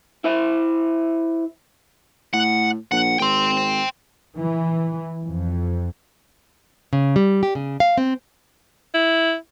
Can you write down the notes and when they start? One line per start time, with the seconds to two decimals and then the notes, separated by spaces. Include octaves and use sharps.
0.24 E4 C5 E5
2.34 A2 F#5
2.92 A#1 F#5
3.19 G#1 G5 C6
4.38 E3
5.24 F2
6.93 C#3
7.16 G3
7.43 G4
7.55 C#3
7.80 F5
7.98 C4
8.94 E4